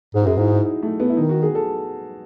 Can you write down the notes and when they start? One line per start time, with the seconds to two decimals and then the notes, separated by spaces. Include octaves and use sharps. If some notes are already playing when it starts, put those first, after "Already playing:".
0.14 G#2 G#4
0.22 F#4
0.26 F#2 G#4
0.37 G#2 E4
0.52 D#4
0.83 A3
1.00 B3
1.09 E4
1.16 D#3 D#4
1.29 F#4
1.43 G#4
1.55 A4